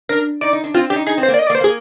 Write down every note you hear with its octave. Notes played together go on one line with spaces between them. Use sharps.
D4 A#4
D#4 D5
D#4
D4
C4 F4
D4 G4
D#4
D#4 G#4
C4
C5
A#3
D5
D#5
D5
A#3
C5
A#3 G#4